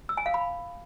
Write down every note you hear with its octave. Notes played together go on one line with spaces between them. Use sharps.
E6
G#5
F5
B5